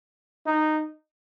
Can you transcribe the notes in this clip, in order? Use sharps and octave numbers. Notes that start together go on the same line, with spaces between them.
D#4